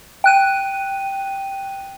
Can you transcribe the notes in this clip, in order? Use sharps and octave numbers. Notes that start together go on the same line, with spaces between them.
G5 F#6 D#7